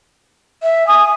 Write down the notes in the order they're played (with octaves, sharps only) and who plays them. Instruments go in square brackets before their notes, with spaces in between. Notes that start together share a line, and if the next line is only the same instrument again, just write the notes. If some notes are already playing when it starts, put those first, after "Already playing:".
[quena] E5
[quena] G#5 [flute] D#6